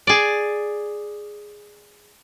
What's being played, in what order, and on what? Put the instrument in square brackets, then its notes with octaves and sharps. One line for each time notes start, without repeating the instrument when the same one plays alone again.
[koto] G#4 D5